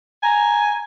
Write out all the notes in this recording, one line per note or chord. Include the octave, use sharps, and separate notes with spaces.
G#5 A#5